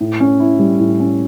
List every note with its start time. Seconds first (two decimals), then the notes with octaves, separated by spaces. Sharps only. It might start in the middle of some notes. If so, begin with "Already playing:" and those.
0.01 A2
0.20 C#4
0.40 E4
0.59 G3
0.80 A2
1.00 C#4